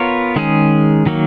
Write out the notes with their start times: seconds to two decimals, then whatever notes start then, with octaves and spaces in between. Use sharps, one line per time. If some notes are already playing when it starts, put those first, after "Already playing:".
Already playing: B3 F4 A#4 C#5
0.36 D#3 G#3 C#4 G#4
1.06 D#3 F#3 A#3